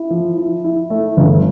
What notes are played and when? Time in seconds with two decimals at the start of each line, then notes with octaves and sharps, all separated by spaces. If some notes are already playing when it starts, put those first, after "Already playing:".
Already playing: E4
0.10 F3
0.37 E4
0.64 E4
0.90 A3
1.17 G1